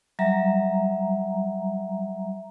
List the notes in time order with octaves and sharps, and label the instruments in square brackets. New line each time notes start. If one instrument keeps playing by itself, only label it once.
[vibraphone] F#3 G3 E5 A#5